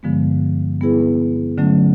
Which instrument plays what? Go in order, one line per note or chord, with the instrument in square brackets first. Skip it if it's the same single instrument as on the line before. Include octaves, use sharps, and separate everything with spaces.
[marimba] G2 D3 F3 G#3 B3
G3 B3 E4 G#4 B4
D3 F#3 A3 C#4